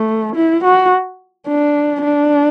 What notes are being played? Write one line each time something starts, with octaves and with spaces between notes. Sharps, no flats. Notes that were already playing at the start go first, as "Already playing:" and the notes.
Already playing: A3
E4
F#4
D4
D4